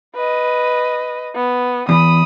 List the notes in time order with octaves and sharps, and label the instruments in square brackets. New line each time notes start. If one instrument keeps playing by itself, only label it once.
[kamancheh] B4 D#5
B3
[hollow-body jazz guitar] E2 E3 [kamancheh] B5 D#6